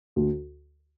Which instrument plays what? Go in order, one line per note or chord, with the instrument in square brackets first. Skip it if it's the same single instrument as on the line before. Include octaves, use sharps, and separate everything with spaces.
[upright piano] D2